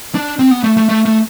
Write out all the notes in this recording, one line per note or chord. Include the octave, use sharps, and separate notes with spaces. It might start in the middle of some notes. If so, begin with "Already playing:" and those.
D4
C4
B3
A3
A3
A3
A3